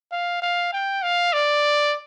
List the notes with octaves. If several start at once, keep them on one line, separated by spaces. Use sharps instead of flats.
F5
F5
G5
F5
D5